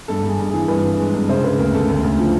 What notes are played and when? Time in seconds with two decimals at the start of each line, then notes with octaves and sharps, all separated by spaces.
0.08 G2 A4
0.23 G2
0.29 G#4
0.39 G2
0.49 E3 G#4
0.68 G2 B4
0.83 E3
0.99 G#3
1.14 G2
1.29 C#3 C5
1.44 C#3 B4
1.58 D2 A#4
1.74 D2 A4
1.89 D2
2.04 D2
2.19 F3